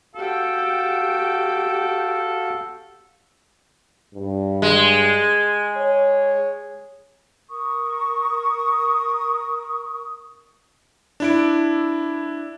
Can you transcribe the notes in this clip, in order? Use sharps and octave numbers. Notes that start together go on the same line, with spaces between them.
F#4 G4 A4 F5 G5
G2
G#3
C#5
A#4 C#6 D#6
D4 E4 D7